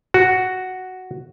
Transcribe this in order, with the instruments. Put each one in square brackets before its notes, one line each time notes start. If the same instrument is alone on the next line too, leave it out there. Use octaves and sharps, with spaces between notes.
[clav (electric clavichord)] F#4